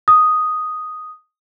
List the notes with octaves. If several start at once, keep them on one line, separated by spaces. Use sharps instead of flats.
D#6